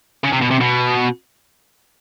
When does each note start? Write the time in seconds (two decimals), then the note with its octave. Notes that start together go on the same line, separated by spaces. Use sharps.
0.24 C#3
0.32 C3
0.42 B2
0.51 C3
0.61 B2